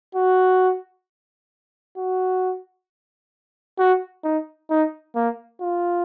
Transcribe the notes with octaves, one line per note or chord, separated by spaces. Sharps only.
F#4
F#4
F#4
D#4
D#4
A#3
F4